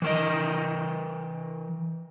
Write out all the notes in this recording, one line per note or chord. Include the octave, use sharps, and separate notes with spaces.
E3 A#4 D#5